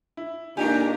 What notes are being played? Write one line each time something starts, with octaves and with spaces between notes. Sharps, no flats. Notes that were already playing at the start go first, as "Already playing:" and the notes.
E4
A#2 G#3 D4 D#4 G4 A#4 G#5 A#5